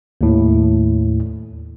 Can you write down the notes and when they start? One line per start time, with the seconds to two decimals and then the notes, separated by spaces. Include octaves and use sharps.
0.21 D#2 A2